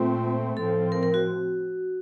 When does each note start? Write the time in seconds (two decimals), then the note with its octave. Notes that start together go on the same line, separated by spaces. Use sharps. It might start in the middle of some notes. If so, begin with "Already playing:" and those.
Already playing: A#2 A3 C4 F4
0.57 A2 F3 C4 A4
0.92 A#4
1.03 A#4
1.14 F#4